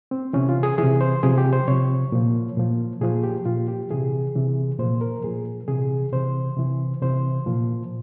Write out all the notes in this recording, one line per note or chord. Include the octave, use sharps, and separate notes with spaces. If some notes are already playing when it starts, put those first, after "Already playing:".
C4
C3 E3 C#4
F4
G#4
C3 E3 G#4
C5
C3 F3 G#4
G4
C5
C3 F3 C#5
A#2 F3
A#2 F3
A#2 F3 G#4
G4
A#2 F3 F4
G4
C3 E3 G#4
C3 E3
A#2 F3 C5
A#4
A#2 F3 G#4
C3 E3 G#4
C3 E3 C5
C3 E3
C3 E3 C5
A#2 F3